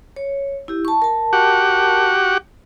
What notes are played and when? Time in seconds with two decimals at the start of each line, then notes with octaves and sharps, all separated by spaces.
0.16 C#5
0.68 E4 G4
0.85 A5 C#6
1.02 A#4 A5
1.33 F#4 G4 F#5